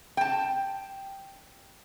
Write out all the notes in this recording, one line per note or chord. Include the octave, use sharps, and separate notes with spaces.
G5 A5